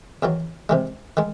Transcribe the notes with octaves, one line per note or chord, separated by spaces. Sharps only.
E2 D#3 F#3
C3 D#3 G#3
D#3 G#3